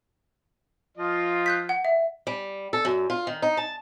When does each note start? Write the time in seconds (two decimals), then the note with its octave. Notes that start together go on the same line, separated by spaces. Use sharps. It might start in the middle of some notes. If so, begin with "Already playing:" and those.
0.98 F3 F4 D#5
1.46 F#6 G6 B6
1.69 F#5
1.85 E5
2.27 G3
2.73 A4
2.85 F#2
3.10 F4
3.27 D#3
3.42 D#4
3.57 A5